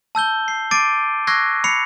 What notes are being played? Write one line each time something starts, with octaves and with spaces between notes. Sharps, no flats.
A5 E6 G6 G7
C7
D6 A6 C7 D7 D#7
C#6 E6 F#6 G#6 A#6 C7
B5 C7 C#7 F7